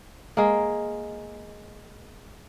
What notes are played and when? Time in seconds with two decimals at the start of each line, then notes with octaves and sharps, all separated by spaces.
0.37 G#3 A#3